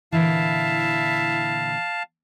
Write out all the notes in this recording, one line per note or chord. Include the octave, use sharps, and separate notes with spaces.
A#2 D3 E3 E4 F5 A5